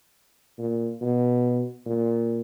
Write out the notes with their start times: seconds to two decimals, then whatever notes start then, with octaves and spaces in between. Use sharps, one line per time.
0.58 A#2
1.01 B2
1.86 A#2